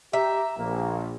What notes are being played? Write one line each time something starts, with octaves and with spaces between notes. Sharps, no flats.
G4 E5 A#5
A#1 A#3